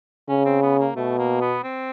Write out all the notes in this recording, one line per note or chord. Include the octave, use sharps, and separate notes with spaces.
C#3 C#4
C4
B3
A#3
B2 A3
A#3
B3
C4